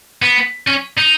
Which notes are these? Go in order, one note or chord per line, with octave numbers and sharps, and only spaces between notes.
B3
C#4
D#4